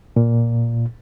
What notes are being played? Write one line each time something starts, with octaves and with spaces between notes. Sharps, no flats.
A#2